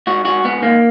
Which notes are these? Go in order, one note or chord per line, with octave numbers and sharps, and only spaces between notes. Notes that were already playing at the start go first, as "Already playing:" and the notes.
G#2 F#4
G#2 F#4
G#2 B3
D#3 A#3